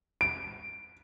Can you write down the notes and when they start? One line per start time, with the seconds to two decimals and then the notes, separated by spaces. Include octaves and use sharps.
0.21 D7